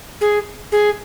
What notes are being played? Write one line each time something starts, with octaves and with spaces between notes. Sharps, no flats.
G#4
G#4